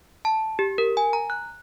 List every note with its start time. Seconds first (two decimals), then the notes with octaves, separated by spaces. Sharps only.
0.25 A5
0.59 G4
0.78 A#4
0.97 G#5
1.13 A#5
1.30 F#6